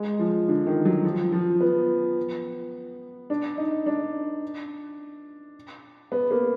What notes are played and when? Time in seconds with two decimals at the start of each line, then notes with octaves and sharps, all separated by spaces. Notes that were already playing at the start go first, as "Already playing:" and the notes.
Already playing: G#3
0.19 F3
0.48 D3
0.67 D#3
0.85 F#3
1.05 F3
1.32 F3
1.61 B3
3.30 D4
3.58 D#4
3.86 D4
6.12 B3
6.31 A#3